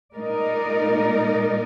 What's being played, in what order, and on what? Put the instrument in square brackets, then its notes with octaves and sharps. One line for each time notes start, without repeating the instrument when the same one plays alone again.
[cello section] A#2 G#3 D#4 A#4 D5